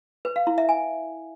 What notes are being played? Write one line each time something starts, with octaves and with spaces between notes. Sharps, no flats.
B4
F5
E4
E5
G#5